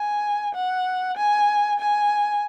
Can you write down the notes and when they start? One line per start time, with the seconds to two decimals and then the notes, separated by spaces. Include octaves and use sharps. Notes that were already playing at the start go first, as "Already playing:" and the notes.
Already playing: G#5
0.55 F#5
1.17 G#5
1.80 G#5